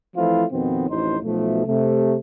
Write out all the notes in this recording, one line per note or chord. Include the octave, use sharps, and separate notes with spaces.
E3 F3 A3 C4 E4 F4
F2 B2 D#3 F3 B3 C4
A1 F2 A2 D#4 C5
B1 B2 F3 A3
C3 A3